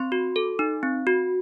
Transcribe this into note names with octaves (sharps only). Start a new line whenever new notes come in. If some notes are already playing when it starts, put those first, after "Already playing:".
Already playing: C4 C6
F#4
A4
D#4
C4
F#4